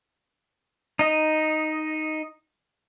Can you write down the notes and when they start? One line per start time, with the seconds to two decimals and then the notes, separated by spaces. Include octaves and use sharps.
0.99 D#4 D#5